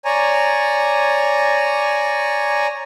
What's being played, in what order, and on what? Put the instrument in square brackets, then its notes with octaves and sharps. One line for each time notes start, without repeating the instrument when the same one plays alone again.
[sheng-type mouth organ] C#5 D5 G#5 A#5